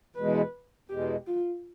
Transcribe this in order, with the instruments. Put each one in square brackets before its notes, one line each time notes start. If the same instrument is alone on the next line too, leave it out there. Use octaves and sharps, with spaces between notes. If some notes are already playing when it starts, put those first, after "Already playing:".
[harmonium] E2 B2 G#3 [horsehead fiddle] B4
[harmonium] E2 B2 G#3 [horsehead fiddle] G4
[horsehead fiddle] F4